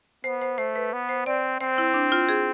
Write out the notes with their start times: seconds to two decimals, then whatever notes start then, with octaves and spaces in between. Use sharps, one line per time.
0.24 B3 C5
0.42 C5
0.58 A3 C5
0.76 B4
0.93 B3
1.09 C5
1.26 C4 D5
1.60 C4 C5
1.78 E4
1.94 D4
2.12 F4
2.29 G#4